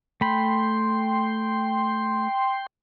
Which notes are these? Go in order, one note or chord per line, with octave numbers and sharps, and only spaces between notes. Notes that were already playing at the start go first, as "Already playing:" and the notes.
A3 G5 B5 C6